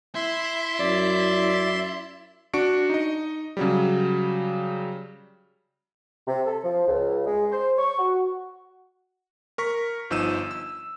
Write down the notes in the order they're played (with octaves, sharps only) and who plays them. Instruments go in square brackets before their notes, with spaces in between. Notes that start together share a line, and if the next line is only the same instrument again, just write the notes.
[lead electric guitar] E4 [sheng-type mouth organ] E5 C6
[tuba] F#2 [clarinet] D5
[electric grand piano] D4 F#4 C#6 C#7 D7
D#4 D#5
C#3 F#3 G3
[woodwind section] C3
A4
F3
C#2
G#3
C5
C#6
F#4
[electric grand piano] A#4 C#6 B6
G1 F3 D#4 E6 D#7 E7
E6